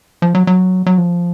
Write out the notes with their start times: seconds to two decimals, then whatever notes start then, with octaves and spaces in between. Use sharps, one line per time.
0.22 F3
0.35 F#3
0.47 F#3
0.86 F#3
0.98 F3